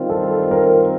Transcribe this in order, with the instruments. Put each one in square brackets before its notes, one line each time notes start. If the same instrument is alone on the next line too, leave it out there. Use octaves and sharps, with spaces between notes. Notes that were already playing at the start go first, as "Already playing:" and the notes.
Already playing: [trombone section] D#3 G3 C4 F4
[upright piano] A4
A#4